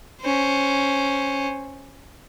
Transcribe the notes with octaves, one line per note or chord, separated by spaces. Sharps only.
C#4 C5